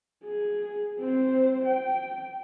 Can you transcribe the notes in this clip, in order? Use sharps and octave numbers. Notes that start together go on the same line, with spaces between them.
G#4
C4 C5
G5